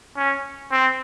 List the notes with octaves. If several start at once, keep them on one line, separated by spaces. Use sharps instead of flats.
C#4
C4